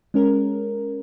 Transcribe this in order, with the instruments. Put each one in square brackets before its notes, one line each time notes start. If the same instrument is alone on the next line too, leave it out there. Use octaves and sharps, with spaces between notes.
[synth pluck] G#3 C#4 A#4